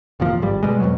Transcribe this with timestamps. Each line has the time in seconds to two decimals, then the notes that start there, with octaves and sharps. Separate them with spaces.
0.20 F1 D#2 A#2 F3
0.42 G#1 G2 G3
0.63 B2 G3 G#3
0.80 F2 G#2 B2 F#3